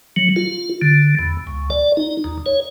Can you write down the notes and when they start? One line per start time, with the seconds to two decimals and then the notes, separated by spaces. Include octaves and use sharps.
0.16 F#3
0.36 F4
0.82 D3
1.19 E2
1.47 C#2
1.70 D5
1.97 D#4
2.24 D#2
2.46 C#5